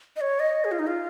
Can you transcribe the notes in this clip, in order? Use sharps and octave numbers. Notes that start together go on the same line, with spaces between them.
D#5
C#5
D#5
G#4
F4
D#4
F4